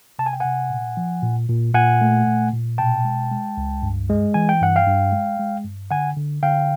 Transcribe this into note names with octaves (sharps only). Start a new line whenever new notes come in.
C3 A5
G#5
G5
C3 F#5 G#5
A#2
F3
A#2
A#2
A#2 F#5 G#5
A3
A#2
A#2
B2 G5 A5
G#3
G#3
C#2
G2
G#3
E3 G#5
G5
G2 F#5
F5 G5
G2
G#3
G#3
G2
D3 F#5 G#5
D3
D3 F5 G5